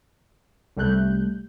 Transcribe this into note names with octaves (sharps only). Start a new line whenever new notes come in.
C2 G3 A3 F#6 G6